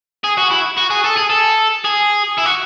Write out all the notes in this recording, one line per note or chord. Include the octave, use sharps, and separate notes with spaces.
G#4
F#4
E4
F#4
G#4
A4
G#4
A4
G#4
E4
F#4